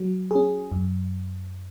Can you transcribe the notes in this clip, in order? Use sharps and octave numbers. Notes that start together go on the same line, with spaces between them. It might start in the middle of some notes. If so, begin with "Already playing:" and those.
Already playing: F#3
C#4 G#4
F#2